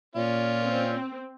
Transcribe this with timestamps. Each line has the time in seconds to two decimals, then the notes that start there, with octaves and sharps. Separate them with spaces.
0.15 A#2 C#4 F4 D5
0.63 C4